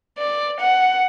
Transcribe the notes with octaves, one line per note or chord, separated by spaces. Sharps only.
D5
F#5